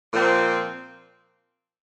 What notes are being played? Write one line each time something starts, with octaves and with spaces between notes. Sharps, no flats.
A#2 F3 C4